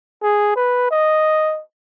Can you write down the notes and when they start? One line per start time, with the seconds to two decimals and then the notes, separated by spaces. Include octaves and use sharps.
0.23 G#4
0.56 B4
0.91 D#5